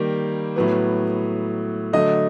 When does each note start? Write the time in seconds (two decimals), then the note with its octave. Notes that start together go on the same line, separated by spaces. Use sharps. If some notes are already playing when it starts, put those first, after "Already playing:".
Already playing: D#3 G3 A#3
0.56 A2 F#3 B3
1.93 D3 F#3 A3 D#5